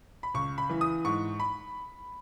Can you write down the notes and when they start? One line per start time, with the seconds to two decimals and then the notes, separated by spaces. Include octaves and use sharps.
0.23 B5
0.34 C#2 C#6
0.58 B5
0.69 E3
0.81 D#6
1.05 G#2 C#6
1.40 B5